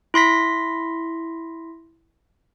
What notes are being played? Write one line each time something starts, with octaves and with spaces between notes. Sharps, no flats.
E4 C6 A#6 B6